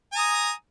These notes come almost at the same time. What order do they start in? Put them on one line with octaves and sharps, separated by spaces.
G#5 A#5 D#6